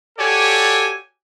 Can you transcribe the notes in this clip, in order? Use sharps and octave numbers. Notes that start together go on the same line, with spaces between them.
F#4 G4 A4 C#5 D5 G#5